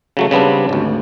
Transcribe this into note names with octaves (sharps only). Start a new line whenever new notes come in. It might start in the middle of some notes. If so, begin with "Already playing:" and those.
C#3 F#3 A3
C#3 G3 B3 C4 D4
G#1 D2